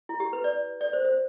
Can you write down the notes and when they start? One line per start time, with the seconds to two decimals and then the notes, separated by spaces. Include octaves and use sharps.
0.09 E4
0.20 G4
0.33 B4
0.44 D5
0.81 D5
0.93 C5
1.05 C5